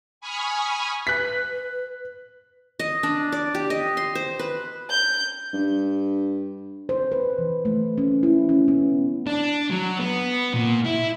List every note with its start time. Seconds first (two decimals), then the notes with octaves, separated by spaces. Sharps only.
0.21 G#5 B5 C#6 D#6 F6
1.07 B4 F#6 B6
2.79 D#5
3.03 D4
3.32 D5
3.55 G4
3.70 D#5
3.97 C6
4.15 C5
4.39 B4
4.90 G6
5.54 G2
6.89 C5
7.12 B4
7.38 E3
7.65 A3
7.98 C#4
8.23 E4
8.49 C#4
8.68 B3
9.27 D4
9.70 F#3
9.99 B3
10.54 A#2
10.85 E4